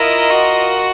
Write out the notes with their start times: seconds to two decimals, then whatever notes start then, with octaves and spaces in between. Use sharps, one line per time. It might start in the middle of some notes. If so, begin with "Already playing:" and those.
Already playing: E4 F4 A#4 D#5
0.31 F#4